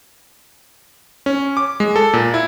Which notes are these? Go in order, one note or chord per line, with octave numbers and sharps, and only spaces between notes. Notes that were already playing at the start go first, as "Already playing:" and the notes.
C#4
D6
G#3
A4
A#2
E4